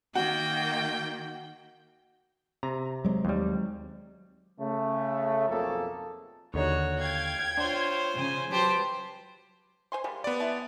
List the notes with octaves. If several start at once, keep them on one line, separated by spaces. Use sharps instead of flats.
D#3 A#3 F#4 G5
C3 A#5
F#3 G#3 C4
D#2 G3
C#3 A3
B1 F2 A#3 G#4 A4
D#2 D3 D#4 F#4 C#5
F5 G5 G#6
D4 F4 C5 C#5
C#3 G#5
F#3 G4 B4 C5 A5
C5 G#5 C6
G3 G#3 A#3
B3 D5
G#3 E4 A5